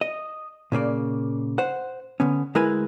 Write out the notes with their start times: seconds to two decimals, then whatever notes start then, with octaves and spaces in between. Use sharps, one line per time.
0.01 D#5
0.72 A#2 C#3 A#3 D5
1.58 C5 F#5
2.20 D3 B3 C#4
2.55 D2 G#3 E4 A#4 B4 G#5